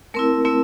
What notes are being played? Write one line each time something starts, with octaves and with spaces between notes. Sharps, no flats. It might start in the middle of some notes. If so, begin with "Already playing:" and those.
A3 C4 E4 A#4
A3 C4 E4